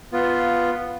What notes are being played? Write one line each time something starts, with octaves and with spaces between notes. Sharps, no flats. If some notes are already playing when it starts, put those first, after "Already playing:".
B3 F4